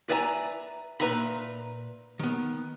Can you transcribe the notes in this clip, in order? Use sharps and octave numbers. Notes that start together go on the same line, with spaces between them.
B4 D5 E5 G#5 A#5
A#2 B4 E5 A#5 B5
D#3 B3